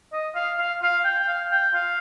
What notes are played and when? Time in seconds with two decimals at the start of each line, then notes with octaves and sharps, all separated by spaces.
0.12 D#5
0.35 F5
0.58 F5
0.82 F5
1.04 G5
1.18 G5
1.28 F5
1.51 G5
1.74 F5